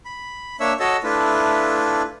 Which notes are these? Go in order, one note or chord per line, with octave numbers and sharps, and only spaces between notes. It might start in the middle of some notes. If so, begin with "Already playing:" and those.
B5
A#3 D4 C#5 E5 E6
F#4 A4 C#5 D#5 A5 E6
A3 D4 E4 F4 B4